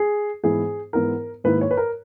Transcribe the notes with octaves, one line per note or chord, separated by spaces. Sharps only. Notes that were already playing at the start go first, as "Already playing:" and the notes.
Already playing: G#4
G#2 E3 B3 E4 G#4
G#2 E3 B3 E4 A#4
G#2 D#3 A#3 E4 B4
C#5
B4
A#4